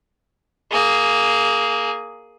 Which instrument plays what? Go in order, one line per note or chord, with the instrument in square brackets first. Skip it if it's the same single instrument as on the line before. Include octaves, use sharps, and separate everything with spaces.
[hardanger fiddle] A#3 G#4